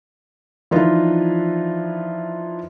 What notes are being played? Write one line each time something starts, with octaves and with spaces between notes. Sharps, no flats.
E3 F3 D4 D#4 F4 B4